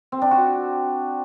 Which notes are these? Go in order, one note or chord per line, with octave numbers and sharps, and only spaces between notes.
C4
D4
F#4